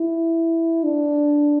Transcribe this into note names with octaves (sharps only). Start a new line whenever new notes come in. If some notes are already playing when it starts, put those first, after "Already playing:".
Already playing: E4
D4